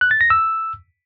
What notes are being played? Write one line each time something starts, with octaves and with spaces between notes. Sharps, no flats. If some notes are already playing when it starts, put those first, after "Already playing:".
F#6
A6
A#6
E6